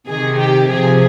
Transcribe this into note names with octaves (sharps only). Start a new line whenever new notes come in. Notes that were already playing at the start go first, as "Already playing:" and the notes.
C3 D#3 G#4
G4
C3 F3 G#4